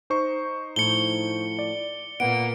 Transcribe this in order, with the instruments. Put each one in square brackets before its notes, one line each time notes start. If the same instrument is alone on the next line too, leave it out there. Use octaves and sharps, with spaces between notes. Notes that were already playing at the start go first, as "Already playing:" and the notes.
[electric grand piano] D#4 C5 C#6
[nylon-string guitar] A2 F3 [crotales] C#7 G7
[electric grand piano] D5
[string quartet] A#2 A#3 B3 [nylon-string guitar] F#5 [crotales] D7